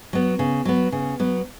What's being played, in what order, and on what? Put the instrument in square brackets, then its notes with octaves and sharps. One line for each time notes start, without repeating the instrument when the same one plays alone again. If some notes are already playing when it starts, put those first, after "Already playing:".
[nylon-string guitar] F#3 B3
C#3
F#3 B3
C#3
F#3 B3